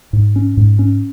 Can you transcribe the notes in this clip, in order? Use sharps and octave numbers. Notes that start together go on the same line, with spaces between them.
G#2
C#4
G#2
C#4